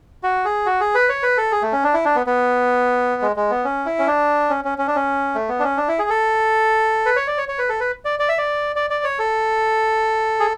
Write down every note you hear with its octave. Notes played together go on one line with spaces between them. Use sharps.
F#4
G#4
F#4
G#4
B4
C#5
B4
A4
G#4
A3
C#4
D4
E4
D4
B3
B3
G#3
G#3
B3
C#4
E4
C#4
D4
C#4
C#4
C#4
D4
C#4
A3
B3
D4
C#4
D4
E4
G#4
A4
B4
C#5
D5
C#5
C#5
B4
A4
B4
D5
D5
E5
D5
D5
D5
C#5
A4
G#4